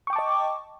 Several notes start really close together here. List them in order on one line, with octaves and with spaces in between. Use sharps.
C#6 G5 D6 A5 D#5